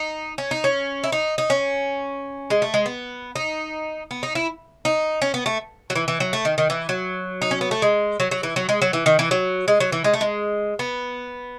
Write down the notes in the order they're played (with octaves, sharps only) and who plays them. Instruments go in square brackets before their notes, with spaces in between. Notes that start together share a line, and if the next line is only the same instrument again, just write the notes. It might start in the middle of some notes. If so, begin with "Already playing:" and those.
Already playing: [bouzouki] D#4
C#4
D#4
C#4
E4
D#4
D#4
C#4
G#3
A3
G#3
B3
D#4
B3
D#4
E4
D#4
C#4
B3
A3
F#3
E3
E3
F#3
A3
D#3
D#3
E3
F#3
D#4
C#4
B3
A3
G#3
F#3
F#3
E3
F#3
G#3
F#3
E3
D#3
E3
F#3
G#3
F#3
E3
G#3
A3
G#3
B3